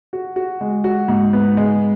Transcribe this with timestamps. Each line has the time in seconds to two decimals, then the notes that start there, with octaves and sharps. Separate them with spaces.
0.13 F#4
0.36 F#4
0.61 G#3
0.84 F#4
1.08 G#2
1.33 B3
1.57 G#3